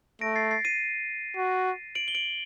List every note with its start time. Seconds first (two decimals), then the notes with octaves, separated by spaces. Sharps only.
0.21 A3 A#6 D7
0.36 A6 C7
0.51 A6 C7
0.65 C7 D#7
1.37 F#4
1.95 D7 F#7
2.08 G7
2.15 D7 F#7